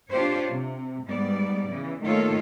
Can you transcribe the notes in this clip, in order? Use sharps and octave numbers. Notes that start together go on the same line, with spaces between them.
D4 F4 G4 C5 C#5
C3
G#2 G3 B3 D5
C#3 E3
D#3 A3 A#3 F4 A4 C#5